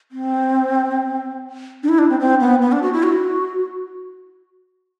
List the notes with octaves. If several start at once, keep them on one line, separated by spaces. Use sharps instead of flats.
C4
D4
E4
D4
C4
C4
B3
B3
D4
F#4
E4
F#4